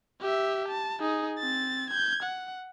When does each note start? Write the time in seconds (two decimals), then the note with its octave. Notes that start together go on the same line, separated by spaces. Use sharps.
0.21 G4 E5
0.69 A5
1.00 D#4 G#4
1.39 C4 A6
1.91 G6 G#6
2.23 F#5